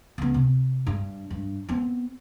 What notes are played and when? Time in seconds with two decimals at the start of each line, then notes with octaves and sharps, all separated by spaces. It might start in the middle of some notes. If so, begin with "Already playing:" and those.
0.18 C#2 B3
0.34 C3
0.87 G2
1.31 G2
1.69 B3 C4